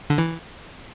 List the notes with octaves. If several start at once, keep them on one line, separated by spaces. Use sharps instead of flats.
D3
E3